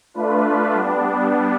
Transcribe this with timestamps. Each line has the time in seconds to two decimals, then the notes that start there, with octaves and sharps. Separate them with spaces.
0.14 A3 D4 F4 B4
0.74 G3 B3 D4